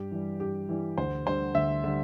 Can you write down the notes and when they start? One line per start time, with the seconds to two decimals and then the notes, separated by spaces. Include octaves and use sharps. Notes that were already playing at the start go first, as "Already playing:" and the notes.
Already playing: G2 G4
0.11 E3 G3
0.40 G2 G4
0.69 E3 G3
0.98 D2 C5
1.26 D3 G3 C5
1.55 D2 E5
1.84 D3 G3